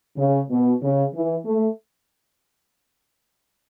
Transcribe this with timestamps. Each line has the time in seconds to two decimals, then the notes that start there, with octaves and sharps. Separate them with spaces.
0.17 C#3
0.50 B2
0.82 C#3
1.14 E3
1.45 A3